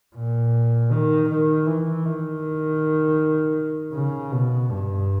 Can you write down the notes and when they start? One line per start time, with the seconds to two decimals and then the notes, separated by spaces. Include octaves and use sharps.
0.16 A#2
0.92 D#3
1.29 D#3
1.67 E3
2.05 D#3
3.93 C#3
4.32 B2
4.70 G2